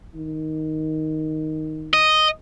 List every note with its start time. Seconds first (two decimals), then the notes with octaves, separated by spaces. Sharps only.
0.15 D#3
1.94 D#5